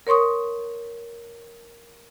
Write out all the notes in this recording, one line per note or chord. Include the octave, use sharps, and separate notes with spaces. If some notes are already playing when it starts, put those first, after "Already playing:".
A#4 C#5 C6 C#6 D#6